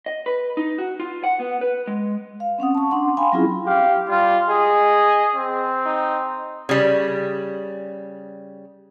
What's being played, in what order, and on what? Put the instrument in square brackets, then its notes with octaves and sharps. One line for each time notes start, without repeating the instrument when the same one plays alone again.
[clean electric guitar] D#5
B4
D#4
F#4
F4
F#5
B3
B4
G#3
[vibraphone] F5
C4 C#4 F#5 D#6
A5 C#6
D4 F#5 C6
F5 G5 G#5 B5 C6
F#3 C4 C#4 E4 F4 G#4
[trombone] G4 [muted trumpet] F5
[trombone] G3 [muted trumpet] F4
[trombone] G#4 [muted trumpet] D#5
[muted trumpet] C4
[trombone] D#4
[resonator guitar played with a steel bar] C#3 G3